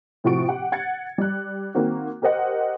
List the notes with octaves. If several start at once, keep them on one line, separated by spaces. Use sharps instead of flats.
A2 C3 F3 F#4 C#6 D7
G4 F#5
F#5 G#6 A6 C#7
G3 F#6
D#3 A#3 C4 F#4
G4 A#4 C5 D#5 F#5